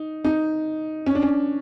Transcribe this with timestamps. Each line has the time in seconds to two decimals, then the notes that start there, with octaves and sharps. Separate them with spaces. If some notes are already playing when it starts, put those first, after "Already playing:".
Already playing: D#4
0.25 D#4
1.06 C#4
1.15 D4
1.23 C#4